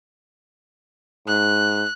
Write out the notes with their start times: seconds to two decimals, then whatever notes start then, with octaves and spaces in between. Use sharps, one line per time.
1.27 G#2 F#6